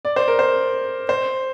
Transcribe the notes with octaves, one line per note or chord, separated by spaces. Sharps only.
D5
C5
A#4
C5
C5